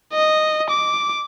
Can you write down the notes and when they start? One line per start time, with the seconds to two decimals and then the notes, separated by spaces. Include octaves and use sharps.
0.13 D#5
0.71 D6